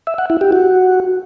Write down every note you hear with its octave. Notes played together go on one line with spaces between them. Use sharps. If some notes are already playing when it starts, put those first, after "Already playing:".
E5
F#5
E4
G4
F#4